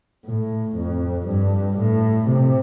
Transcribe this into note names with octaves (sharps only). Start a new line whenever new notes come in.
A2
F2
G2
A2
C3